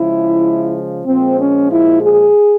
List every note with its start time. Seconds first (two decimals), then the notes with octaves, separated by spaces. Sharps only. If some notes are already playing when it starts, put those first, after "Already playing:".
Already playing: C#3 F3 G#3 E4
1.04 A#2 F3 G#3 C4
1.37 C#4
1.70 E4
2.01 G#4